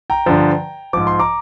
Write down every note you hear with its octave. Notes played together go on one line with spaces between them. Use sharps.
G5 A#5
G2 D3 F3
G#2 F3 D6
C6
A#5 D6